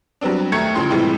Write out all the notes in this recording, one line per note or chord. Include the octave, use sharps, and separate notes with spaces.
F#3 G3 B3 C4 D4
D#2 A3 A#5 C#6 G#6 C#7
A1 C#3 F3 C6
A2 C3 E3 F3 G3 G#3